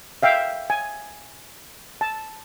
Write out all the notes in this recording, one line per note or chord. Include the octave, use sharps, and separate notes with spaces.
E5 F5 G5
G#5
A5